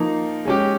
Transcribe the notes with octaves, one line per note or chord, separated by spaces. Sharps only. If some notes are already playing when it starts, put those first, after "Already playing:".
Already playing: F3 A#3 D#4
G#3 C#4 G4